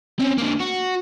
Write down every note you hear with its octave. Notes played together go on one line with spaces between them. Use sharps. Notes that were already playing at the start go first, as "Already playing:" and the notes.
C4 C#4
D3 A#3
F#4